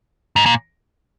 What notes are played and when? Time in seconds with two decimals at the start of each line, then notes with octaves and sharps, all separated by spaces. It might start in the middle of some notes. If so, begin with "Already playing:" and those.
0.36 G#2
0.46 A#2